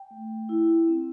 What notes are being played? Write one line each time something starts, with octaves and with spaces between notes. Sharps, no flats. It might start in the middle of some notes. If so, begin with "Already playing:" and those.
Already playing: G5
A3
E4
C4